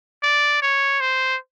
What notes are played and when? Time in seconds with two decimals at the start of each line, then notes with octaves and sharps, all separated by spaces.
0.23 D5
0.62 C#5
1.01 C5